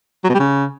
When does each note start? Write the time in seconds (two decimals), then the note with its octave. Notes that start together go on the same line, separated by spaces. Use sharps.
0.24 F#3
0.29 B2
0.34 G3
0.39 C#3